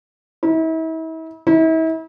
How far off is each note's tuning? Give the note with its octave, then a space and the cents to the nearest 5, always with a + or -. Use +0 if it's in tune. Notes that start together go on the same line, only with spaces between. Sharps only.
E4 -40
E4 -40